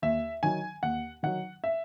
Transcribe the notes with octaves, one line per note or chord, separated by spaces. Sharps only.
D#2 E5
D#3 F#3 G#5
D#2 F#5
D#3 F#3 F#5
E5